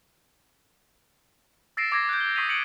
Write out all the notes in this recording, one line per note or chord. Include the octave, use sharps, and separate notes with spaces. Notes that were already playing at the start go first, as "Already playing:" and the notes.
E6 A6 A#6 C7 D7 E7
D6 G#6 A#6
F#6 G6
G7
C#6 D#6 B6 C7 D#7 F7
A#6 C#7 D7 F#7